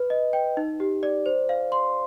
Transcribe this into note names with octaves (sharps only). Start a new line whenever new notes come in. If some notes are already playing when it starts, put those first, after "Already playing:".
Already playing: B4
D#5
G5
D#4
G4
D5
C5
F5
C6